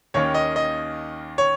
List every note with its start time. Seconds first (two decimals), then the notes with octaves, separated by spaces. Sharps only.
0.14 D#2 D#3 A#3 C#4 C#5
0.34 D#5
0.56 D#5
1.38 C#5